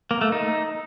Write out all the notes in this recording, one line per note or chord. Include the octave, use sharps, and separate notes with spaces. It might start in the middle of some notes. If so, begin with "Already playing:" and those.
A#3
A3
D#4